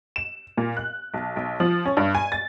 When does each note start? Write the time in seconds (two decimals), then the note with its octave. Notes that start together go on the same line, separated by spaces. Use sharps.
0.16 E7
0.57 A#2
0.77 F#6
1.14 B1
1.36 B1
1.60 F3
1.86 C#4
1.97 G2
2.15 G#5
2.32 A6